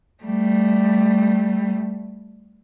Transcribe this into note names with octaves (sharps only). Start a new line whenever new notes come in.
G3 A3